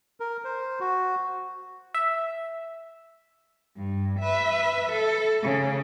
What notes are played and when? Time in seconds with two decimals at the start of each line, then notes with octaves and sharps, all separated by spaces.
0.20 A#4
0.44 C5
0.80 F#4
1.94 E5
3.77 G2
4.19 B4 E5
4.92 A4
5.43 C#3